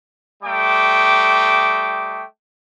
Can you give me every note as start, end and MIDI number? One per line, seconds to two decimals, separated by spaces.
0.43 2.23 55
0.43 2.23 57
0.43 2.23 75
0.43 2.23 79
0.43 2.23 86